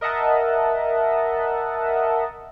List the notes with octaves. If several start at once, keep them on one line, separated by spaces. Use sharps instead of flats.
A#4 D#5 E5 F#5 A5